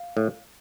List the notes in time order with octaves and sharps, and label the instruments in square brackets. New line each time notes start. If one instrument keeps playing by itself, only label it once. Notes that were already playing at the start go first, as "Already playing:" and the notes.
Already playing: [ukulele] F5
[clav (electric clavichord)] A2